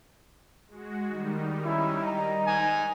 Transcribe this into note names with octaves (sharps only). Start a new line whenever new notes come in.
G#3 F#4
D#3 G3 D#4
C#4 E4
D#5 A#5
D#4 G#5